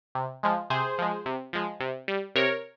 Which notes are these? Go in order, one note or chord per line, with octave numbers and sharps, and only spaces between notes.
C3
F3 G#3
C3 G#4 C5
F3 G#3
C3
F3 G#3
C3
G3
C3 A#4 C#5